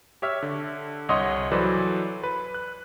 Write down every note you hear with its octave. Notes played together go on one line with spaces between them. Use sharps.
G4 C#5 E5 F6
D3
C2 C#5 D#5 F#5 C6 D#6
E3 F#3 A4 B4 C5 D5
B4
F#6